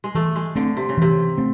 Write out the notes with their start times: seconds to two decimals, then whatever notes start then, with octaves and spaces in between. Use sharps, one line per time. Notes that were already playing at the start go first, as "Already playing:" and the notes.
0.04 G#3
0.15 E3 A3
0.36 G#3
0.55 D3 A3 C4
0.77 C3
0.89 C#3
0.97 C3 E3
1.38 A3 C4